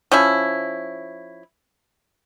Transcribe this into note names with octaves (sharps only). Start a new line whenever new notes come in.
F3 C#4 E4